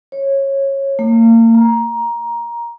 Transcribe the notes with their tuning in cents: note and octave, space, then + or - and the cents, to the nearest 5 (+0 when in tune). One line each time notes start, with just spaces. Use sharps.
C#5 -20
A#3 -35
A#5 +15